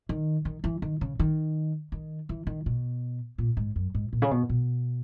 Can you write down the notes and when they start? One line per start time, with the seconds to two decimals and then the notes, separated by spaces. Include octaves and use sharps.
0.09 D#3
0.45 D#3
0.64 E3
0.82 D#3
1.01 C#3
1.19 D#3
1.92 D#3
2.29 E3
2.47 D#3
2.66 B2
3.38 A#2
3.57 G#2
3.76 F#2
3.94 G#2
4.13 A#2
4.22 C#3
4.31 B2
4.49 B2